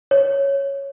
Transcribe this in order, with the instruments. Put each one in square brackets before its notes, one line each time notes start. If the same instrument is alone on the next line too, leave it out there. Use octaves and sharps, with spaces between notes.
[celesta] C#5